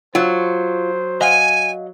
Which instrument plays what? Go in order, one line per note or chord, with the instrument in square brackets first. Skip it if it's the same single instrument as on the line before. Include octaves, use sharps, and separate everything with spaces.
[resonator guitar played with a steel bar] F#3 [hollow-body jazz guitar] F4 [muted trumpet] C5
[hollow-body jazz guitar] D#5 F5 F#5 [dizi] G#5